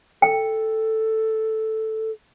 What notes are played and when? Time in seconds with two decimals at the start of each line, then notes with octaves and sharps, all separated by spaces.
0.22 A4 G5